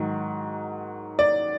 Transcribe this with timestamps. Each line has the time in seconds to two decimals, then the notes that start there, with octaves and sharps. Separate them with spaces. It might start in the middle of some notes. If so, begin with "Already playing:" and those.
Already playing: G#2 D#3 F#3
1.19 D5